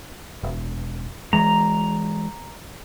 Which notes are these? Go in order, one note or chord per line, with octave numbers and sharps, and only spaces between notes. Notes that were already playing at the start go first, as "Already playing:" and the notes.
E1
E3 G#3 A#5